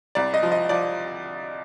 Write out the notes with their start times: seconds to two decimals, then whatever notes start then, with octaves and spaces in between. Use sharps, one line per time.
0.15 C2 D5
0.34 D#5
0.43 F3
0.52 D#5
0.69 F3 D5